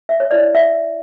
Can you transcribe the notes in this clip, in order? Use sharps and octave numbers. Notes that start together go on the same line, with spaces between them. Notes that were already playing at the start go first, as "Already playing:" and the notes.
E5
C#5
E4 G4 B4 D5
E5